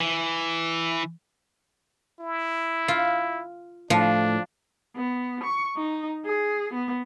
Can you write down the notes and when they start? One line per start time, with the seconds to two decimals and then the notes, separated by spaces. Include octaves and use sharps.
0.01 E3
2.20 E4
2.88 F4
3.90 A2 F3 D4
4.96 B3
5.44 C#6
5.77 D#4
6.25 G#4
6.74 B3